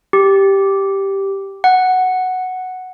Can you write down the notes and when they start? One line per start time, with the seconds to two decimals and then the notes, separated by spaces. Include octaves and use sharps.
0.13 G4
1.64 F#5